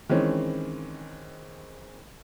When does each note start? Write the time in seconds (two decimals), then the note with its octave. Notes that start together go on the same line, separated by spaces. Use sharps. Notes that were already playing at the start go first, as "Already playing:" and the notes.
0.09 D#3 E3 G#3 C4 C#4